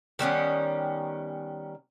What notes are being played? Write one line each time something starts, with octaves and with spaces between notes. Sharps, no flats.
D#3 G3 B3 C#4